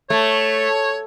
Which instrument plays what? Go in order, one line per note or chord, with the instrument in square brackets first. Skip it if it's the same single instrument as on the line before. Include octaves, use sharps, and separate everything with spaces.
[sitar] A3 [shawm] C#5